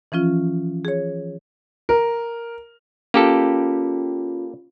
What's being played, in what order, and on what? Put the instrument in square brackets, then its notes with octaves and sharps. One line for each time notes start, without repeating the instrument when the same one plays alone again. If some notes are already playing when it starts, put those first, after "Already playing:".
[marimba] E3 F3 C#4 F4
G#4 C#5
[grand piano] A#4
[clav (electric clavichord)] A#3 G4 A4 [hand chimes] C#4 F4